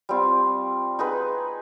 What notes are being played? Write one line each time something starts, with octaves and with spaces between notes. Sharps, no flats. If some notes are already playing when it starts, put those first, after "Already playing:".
G3 C4 F4
D#4 G#4 B4